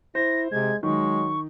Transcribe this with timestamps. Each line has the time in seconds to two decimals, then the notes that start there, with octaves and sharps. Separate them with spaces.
0.15 E4 C5 A#6
0.52 C3 G#3 G#6
0.83 D#3 F#3 G#3 C#6